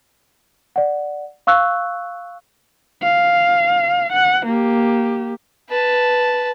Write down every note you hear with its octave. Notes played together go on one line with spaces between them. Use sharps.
D5 F#5
F5 C#6 E6 F#6
F5
F#5
A#3 G4
B4 A5